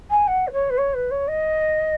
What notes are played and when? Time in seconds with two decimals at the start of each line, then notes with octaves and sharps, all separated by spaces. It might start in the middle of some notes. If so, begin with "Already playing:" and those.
0.10 G#5
0.27 F#5
0.47 B4
0.52 C#5
0.70 B4
0.77 C#5
0.94 B4
1.11 C#5
1.27 D#5